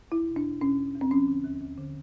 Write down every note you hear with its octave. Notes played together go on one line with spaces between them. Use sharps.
E2 E4
B2
D4
E2
B2 C#4
E2
E2
C4
F3 C#4
D3
D#2
D#2
D3